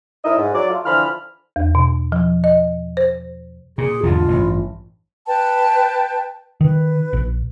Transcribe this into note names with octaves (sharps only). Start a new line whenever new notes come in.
A2 D#4 E4 A#4 D#5 E5
G#2
F#3 D5
A3 F4
D3 E3 F3 B5 F6
E2
B2
F3
D#5
C5
A#2 G#4
E2 G#2 D3 F4
A1 G2
B4 G5 A5
D#3 B4
A#1